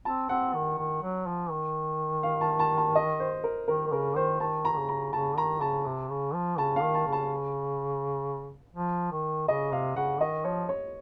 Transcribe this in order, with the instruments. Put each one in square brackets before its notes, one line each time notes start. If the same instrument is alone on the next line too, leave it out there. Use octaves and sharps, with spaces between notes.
[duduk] C4 [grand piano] A5
[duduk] C4 [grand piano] F#5
[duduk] D#3
D#3
F#3
F3
D#3
[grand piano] F5
A5
A5
A5
D#5
C5
A#4
[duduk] D#3 [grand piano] A#4
[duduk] D#3
[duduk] C#3 [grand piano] A#4
[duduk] D#3 [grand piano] C5
[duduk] D#3 [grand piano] A5
[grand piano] A#5
[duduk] D#3
C#3
[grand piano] A#5
[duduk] C#3 [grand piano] A5
[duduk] D#3 [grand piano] A#5
[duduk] C#3 [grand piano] A5
[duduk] C3
C#3
F3
[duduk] C#3 [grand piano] A5
[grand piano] F5
[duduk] D#3
[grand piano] A5
[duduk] C#3
[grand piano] A5
[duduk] F3
D#3
[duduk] C#3 [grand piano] D#5
[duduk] C3 [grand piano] F5
[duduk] C#3 [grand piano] F#5
[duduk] D#3 [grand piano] D#5
[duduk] F3 [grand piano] C#5
[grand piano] C#5